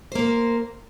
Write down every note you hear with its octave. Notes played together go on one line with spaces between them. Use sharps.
A#3 A#4 C5